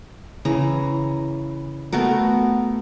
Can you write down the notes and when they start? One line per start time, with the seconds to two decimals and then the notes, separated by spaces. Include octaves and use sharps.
0.45 C#3 E3 A#5
1.92 A3 B3 F#4 A#4